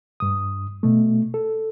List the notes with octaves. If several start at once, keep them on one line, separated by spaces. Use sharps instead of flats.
G2 D#6
B2 A3
A4